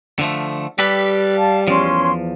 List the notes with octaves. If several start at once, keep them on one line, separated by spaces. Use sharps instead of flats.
D3 F3 A3
G3 G4 A4 B4
F5 A5
E2 F3 C#4 C6